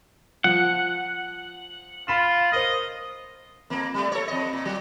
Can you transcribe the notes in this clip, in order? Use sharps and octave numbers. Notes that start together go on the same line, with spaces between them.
F3 F#5
F4 B5 B6 E7
A#4 C5 D#5
F2 A#3
G3 A3
A4 C#5
F2 D#5
A#2
F#3